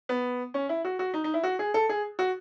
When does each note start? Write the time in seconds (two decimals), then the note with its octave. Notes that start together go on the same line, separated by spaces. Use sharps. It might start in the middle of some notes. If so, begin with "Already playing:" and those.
0.09 B3
0.54 C#4
0.69 E4
0.85 F#4
0.99 F#4
1.14 D#4
1.24 D#4
1.34 E4
1.43 F#4
1.59 G#4
1.74 A4
1.89 G#4
2.19 F#4